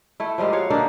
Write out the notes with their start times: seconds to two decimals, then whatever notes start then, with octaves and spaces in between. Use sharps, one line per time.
0.20 A3 E4
0.38 F3 G3 G#3 A#3
0.53 F#4 C#5 F5
0.70 D3 A#3 D4 D#4